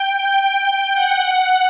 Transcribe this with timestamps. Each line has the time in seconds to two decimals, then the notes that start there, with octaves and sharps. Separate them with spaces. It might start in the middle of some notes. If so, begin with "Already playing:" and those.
Already playing: G5
0.94 F#5